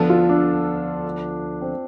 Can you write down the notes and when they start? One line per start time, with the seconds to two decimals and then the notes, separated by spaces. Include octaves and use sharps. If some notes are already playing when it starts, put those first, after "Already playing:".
Already playing: D2 D3 F3 B3 A4
0.10 F4
0.29 D4
1.62 C4